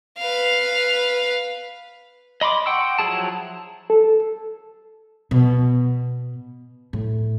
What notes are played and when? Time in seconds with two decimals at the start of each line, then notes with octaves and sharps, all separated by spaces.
0.18 B4 F5
2.41 D#5 B5 C6 D6
2.66 F#5 G5 C6 C#6 E6
2.99 F3 F#3 E4 G#4 A5
3.90 A4
5.31 B2
6.93 A2